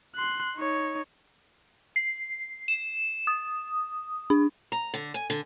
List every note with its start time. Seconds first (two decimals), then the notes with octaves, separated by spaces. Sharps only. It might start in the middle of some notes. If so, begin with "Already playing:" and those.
0.16 C6 F#6
0.56 D#4 C#5
1.96 C7
2.68 E7
3.27 D#6
4.30 D4
4.72 A#5
4.94 D3
5.14 G#5
5.30 D3